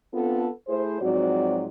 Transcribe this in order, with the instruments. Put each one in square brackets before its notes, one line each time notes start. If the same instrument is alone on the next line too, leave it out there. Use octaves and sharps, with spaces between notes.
[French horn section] B3 C4 D4 F4 A4
A3 E4 G#4 C5
G#2 F3 F#3 C4 F#4 D5